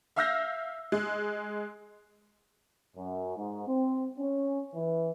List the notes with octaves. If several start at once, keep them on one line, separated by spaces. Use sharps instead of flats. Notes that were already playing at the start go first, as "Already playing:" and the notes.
E5 F5 E6 F6 G6 A#6
G#3
F#2
G#2
C4
C#4
E3